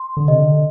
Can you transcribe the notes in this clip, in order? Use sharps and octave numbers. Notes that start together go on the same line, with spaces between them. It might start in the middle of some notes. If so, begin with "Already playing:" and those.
Already playing: C6
D3
C3 D#5
D3